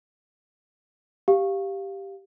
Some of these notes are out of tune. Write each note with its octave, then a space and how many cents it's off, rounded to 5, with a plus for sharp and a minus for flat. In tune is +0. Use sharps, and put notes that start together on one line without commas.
G4 +0 F5 +0